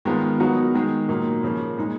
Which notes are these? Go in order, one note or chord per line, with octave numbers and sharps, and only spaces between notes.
D#3 G#3 B3 F4 A#4
F#3 B3 D#4 F#4 A#4
D#3 G#3 D#4 G#4
A#2 F#3 A#3 D#4
C#3 F3 A#3
A#2 G#3 D#4